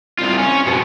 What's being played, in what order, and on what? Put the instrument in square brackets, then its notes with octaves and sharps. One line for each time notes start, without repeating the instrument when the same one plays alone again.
[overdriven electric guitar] C2 F4
C#4
F2 B2